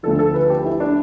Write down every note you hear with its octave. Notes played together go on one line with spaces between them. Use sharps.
D2 D3 F3 A4
A4
B4
G4
E4
D4